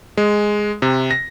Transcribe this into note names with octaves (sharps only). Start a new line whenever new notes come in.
G#3
C3
A#6